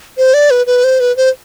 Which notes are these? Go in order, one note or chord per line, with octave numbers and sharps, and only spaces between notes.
C5
D5
B4
B4
C5
B4
C5